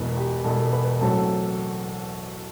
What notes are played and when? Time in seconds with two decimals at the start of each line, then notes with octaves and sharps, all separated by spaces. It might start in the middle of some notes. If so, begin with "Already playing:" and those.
Already playing: E1 E2 B2 B4
0.17 G4
0.44 E1 E2 B2 A4
0.72 B4
1.01 A1 A2 F#3 C4 A4